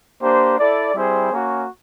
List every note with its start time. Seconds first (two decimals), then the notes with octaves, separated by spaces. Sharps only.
0.22 A#3 D4 G4 C5
0.59 E4 A4 D5
0.95 G3 C4 E4 G#4 C5
1.31 A#3 C#4 F#4